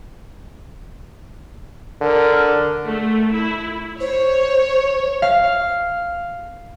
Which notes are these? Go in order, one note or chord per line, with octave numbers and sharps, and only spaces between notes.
D3 A#4
A3
E4
C5 C#5
F5